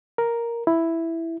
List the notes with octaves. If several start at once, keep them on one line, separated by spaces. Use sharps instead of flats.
A#4
E4